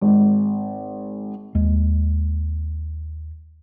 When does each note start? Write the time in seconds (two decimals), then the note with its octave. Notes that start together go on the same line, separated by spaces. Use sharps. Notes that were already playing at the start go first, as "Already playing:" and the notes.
0.01 G#1
1.55 D#2 G#3